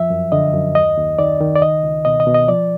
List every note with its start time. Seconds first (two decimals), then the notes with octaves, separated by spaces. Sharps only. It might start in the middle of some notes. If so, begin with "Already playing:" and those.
Already playing: F2 F3 E5
0.10 F#2
0.32 D3 D#5
0.54 F#2
0.75 D#2 D#5
0.97 D#2
1.19 D#3 D5
1.40 D#3
1.55 D5
1.61 C#2 D#5
1.83 C#2
2.05 B2 D#5
2.20 D#5
2.27 B2
2.34 D#5
2.48 F3 D5